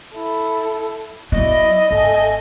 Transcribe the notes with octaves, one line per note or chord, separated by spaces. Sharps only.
E4 A4
F#3 B3 E4 D5 D#5
G#1 A3 G#5